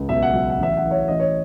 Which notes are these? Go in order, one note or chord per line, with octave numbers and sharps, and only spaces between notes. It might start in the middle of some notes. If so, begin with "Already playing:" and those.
Already playing: C#2
B1 E5
F#5
F#3 E5
F#5
A1 E5
F#5
E3
C#5 E5
A1 D#5
C#5